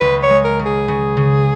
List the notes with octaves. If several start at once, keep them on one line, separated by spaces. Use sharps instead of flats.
C#2 B4
C#5
G#3
A#4
C#3
G#4
C#3
C#3